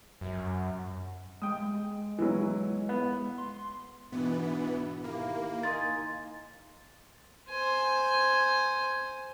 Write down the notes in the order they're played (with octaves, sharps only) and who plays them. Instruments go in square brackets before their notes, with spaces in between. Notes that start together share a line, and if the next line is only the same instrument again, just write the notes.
[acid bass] F#2
[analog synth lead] G#3 [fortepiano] G5 D#6
[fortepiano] E3 F#3
B3
[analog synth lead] C6
[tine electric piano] G#2 B2 [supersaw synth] E3 B3 [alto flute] D4
[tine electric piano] D#3 E4 G4 [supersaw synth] A#3 [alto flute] F5
[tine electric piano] D#4 D#5 G#5 [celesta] C6 A6
[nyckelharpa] C5 G#5